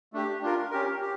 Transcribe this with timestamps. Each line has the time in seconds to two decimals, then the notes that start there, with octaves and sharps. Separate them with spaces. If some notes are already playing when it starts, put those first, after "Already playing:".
0.13 A3 D4 G4
0.42 D4 F4 A#4
0.71 C#4 G4 A#4
1.01 G4